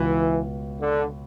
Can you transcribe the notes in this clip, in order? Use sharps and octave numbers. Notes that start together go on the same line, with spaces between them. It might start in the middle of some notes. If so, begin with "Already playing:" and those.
Already playing: C#2 B2 E3
D3